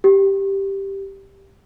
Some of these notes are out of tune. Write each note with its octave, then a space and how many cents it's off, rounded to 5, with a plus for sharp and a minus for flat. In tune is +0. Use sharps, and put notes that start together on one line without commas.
G4 +0